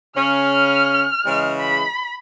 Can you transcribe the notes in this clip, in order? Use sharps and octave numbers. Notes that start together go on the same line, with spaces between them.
C#3 C#4 F6
C#3 E3 G#3
B5